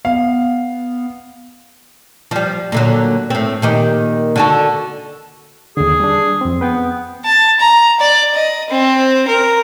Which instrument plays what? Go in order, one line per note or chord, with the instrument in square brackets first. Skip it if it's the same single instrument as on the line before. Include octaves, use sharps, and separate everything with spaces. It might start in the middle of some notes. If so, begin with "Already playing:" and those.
[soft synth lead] B3 [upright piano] F5
[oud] F3 G3
A#2 D3 F#3
A2 C4
A#2 D#3 G4
D3 F#4 A4
[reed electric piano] D#2 D3 [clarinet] G#4
[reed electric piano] G3 D4
F2 C4
[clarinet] B3 [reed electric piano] B4 G5
[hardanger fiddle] A5
A#5
D5
D#5
C4
A#4